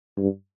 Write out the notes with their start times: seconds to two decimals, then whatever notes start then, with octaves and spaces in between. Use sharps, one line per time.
0.18 G2